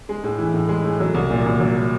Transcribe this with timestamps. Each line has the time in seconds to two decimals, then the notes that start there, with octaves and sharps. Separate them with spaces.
0.09 G#3
0.24 A2
0.38 E3
0.54 A2
0.69 G#3
0.84 A2
1.00 F#3
1.14 C2
1.30 A#2
1.46 C2
1.60 F#3